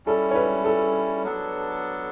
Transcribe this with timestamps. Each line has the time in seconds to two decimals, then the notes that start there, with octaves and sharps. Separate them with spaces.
0.06 G3 C#4 E4 A4
0.31 C#5
0.35 B4
0.65 A4
1.23 F#3 B3 D4 A4